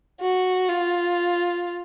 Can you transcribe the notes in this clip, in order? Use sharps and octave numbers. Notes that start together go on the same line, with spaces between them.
F#4
F4